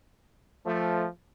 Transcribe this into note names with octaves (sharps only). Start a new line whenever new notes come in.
F3 A3